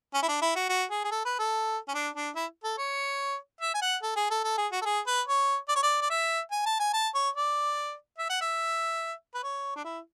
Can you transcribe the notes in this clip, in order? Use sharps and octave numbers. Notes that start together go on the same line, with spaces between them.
C#4
E4
D4
E4
F#4
F#4
G#4
G#4
A4
B4
A4
C#4
D4
D4
E4
A4
C#5
E5
G#5
F#5
A4
G#4
A4
A4
G#4
F#4
A4
G#4
B4
C#5
D5
C#5
D5
D5
E5
G#5
A5
G#5
A5
C#5
D5
E5
F#5
E5
B4
C#5
D4
E4